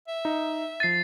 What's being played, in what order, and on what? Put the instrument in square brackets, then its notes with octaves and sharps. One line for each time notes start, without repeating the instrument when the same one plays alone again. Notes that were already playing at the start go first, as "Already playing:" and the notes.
[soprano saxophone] E5
[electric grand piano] D#4
[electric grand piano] F3 D#7 [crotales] A6 C7